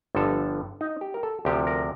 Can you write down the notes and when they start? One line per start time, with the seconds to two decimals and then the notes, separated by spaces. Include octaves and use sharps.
0.15 G1 G2 D3 F3 A4
0.81 D#4
1.01 G4
1.14 A#4
1.23 A4
1.45 D2 C3 F3 G4
1.67 A#4